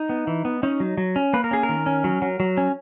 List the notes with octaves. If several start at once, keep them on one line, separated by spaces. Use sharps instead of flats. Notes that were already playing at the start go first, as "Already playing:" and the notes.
Already playing: D#4
B3
E3
B3
C#4 D#4
F#3
F#3
C#4
A#3 B4
A#4
C#4 G#4
A#4
D#3
C#4
F#3
F#3
F#3
C#4